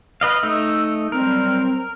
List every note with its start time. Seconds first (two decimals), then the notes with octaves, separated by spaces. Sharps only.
0.21 B4 D#5 F5
0.43 A3 D#4 D#6 E6
1.12 F#3 G3 C4 A#4